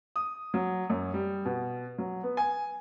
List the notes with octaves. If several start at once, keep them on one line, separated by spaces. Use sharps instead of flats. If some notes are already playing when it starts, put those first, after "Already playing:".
D#6
F#3
F#2
G3
B2
F#3
B3
G#5